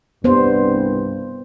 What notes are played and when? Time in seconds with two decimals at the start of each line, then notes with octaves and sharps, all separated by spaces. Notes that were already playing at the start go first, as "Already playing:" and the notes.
0.24 C2 G2 B3 C5